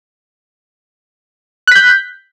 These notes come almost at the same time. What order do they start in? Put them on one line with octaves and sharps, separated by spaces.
F#6 B6 G6